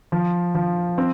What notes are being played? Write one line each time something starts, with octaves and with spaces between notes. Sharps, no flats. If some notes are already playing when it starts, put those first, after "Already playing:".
F3
F3
C4